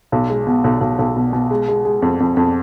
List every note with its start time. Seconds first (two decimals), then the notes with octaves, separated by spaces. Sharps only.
0.12 B1
0.30 G#3
0.47 B2
0.64 B1
0.81 B1
0.99 B1
1.17 B2
1.33 B2
1.51 G#3
1.68 G#3
1.85 G#3
2.02 F2
2.20 F2
2.37 F2